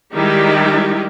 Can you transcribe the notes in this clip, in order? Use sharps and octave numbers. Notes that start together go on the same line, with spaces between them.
D#3 G3 G#3 D#4 E4 G4